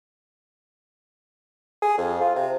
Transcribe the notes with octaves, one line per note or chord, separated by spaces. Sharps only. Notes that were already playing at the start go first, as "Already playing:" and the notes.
G#4
F2
F4
C3